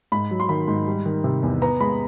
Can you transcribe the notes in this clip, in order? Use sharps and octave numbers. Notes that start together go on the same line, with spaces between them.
G#2 B5
F#3
C6
D#3 B5
G#2
G3
D#3
C3
E2
B3 A#5
G#3 B5